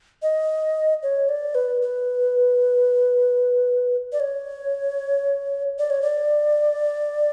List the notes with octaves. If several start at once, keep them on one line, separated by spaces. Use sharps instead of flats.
D#5
C#5
D5
B4
B4
D5
C#5
D5
C#5
D5